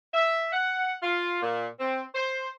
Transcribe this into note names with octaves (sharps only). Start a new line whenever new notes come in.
E5
F#5
F4
A#2
C4
C5